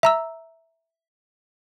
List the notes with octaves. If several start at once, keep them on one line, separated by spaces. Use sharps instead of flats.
E5 A#5 E6